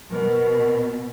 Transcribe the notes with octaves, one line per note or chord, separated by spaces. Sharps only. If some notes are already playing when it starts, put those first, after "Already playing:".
B2 A#4